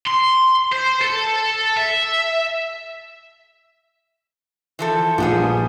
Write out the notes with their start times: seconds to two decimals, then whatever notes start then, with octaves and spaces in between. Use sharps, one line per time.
0.06 C6
0.72 C5
1.01 A4
1.77 E5
4.79 E3 F3 A4
5.18 A#1 G3 B3 G#4